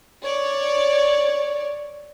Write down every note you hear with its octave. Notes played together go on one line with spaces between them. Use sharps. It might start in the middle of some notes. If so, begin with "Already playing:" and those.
C#5 D5